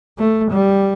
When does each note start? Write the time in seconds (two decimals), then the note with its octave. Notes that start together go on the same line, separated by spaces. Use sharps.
0.18 A3
0.52 G3